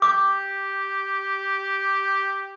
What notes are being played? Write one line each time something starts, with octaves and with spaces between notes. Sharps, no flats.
G4 D6